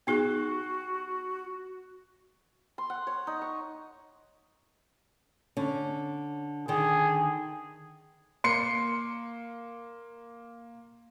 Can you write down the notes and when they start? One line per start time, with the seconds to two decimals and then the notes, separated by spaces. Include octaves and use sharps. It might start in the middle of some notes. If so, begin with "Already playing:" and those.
0.07 B3 D#4 F#4 G#4
2.78 C6
2.90 F#5
3.07 C#5
3.27 D#4
3.42 C#6
5.57 D3 C#4
6.68 D3 D#3 G#4
8.44 A#3 C6 C7 C#7